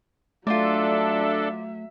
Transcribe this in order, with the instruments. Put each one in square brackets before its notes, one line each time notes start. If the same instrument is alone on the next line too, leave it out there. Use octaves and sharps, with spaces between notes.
[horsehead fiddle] F#3 E5 [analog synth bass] A3 [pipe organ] D4 A4 [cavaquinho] F4 C5 D5